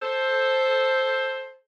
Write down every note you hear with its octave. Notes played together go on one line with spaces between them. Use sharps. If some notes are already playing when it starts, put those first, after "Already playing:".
A4 C5